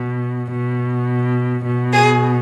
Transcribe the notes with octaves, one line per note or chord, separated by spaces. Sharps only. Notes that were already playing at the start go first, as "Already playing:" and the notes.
Already playing: B2
B2
B2
G#4